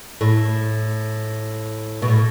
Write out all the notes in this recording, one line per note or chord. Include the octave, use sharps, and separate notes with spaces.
A2
B2
A2